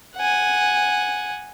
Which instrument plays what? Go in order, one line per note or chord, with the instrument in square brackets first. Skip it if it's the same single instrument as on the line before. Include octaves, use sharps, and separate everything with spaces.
[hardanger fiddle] F#5 G#5